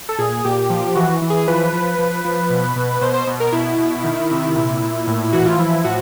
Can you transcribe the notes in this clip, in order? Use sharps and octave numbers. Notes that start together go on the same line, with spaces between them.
A4
A#2 G#4
A#2 G4
F3
E3 F#4
E3
G#4
F3 B4
F3
F3
F3
B2
B2
B2 C5
C5
B2
A#4
B2 E4
B2
D#3
C3
A#2 E4
A#2
A2
E3 F#4
F4
F3 E4
A2 F#4